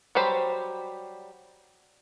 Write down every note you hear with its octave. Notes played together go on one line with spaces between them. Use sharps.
F#3 G3 G4 C5 B5